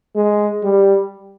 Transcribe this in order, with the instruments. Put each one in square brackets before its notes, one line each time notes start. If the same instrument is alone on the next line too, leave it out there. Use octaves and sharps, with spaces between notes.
[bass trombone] G#3
G3